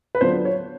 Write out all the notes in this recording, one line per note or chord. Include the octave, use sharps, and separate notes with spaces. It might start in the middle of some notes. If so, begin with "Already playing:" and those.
B4
D3 F#3 B3 D4 F4 C5
C#5